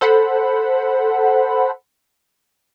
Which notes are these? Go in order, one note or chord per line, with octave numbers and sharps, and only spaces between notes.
A4 C5 F#5 B5